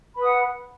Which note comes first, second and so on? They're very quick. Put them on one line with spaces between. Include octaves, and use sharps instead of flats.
B5 B4 D#6 F#5